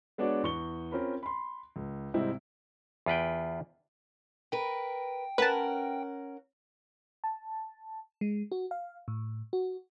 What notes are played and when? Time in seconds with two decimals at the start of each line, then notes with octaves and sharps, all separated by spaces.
0.18 G#3 B3 D4 F#4 C#5 D5
0.43 E2 C#6 G7
0.92 C4 C#4 F4 A#4 B5
1.23 B5 C6
1.76 C#2
2.14 G#2 C3 G3 C4 D#4 E4
3.06 E2 F4 B4 G5
4.52 A#4 B4 G5
5.38 C#4 A#4 B4 F#5 A5
7.24 A5
8.21 G#3
8.52 F#4
8.71 F5
9.08 A2
9.53 F#4